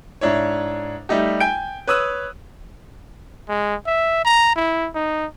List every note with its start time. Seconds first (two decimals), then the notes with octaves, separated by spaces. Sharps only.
0.21 G#2 D4 E4 C#5
1.09 G3 A3 D#4 G4
1.40 G5 G#5 G6 D7
1.87 B4 C#5 D#6 E6 F#6
3.49 G#3
3.87 E5
4.25 A#5
4.56 E4
4.94 D#4